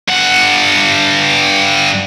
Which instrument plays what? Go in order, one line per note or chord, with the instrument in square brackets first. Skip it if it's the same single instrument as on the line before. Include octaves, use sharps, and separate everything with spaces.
[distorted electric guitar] G2 F#5